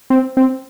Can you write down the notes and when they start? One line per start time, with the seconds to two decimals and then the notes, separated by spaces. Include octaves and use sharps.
0.10 C4
0.37 C4